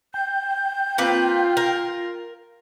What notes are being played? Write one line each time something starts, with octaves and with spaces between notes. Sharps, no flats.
G5 G6
A#3 C4 F4 B4
A#4